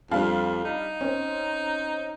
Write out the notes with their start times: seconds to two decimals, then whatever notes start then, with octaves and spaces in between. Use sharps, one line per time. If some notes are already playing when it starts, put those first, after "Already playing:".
0.11 F2 G3 D4 F5
0.65 D#4
1.01 C4 C#4